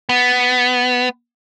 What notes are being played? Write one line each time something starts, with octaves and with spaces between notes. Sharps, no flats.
B3